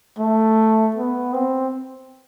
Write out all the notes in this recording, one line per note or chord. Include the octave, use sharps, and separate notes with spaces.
A3
B3
C4